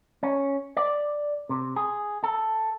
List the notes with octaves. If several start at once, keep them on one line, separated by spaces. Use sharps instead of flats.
C#4
D5
C3
G#4
A4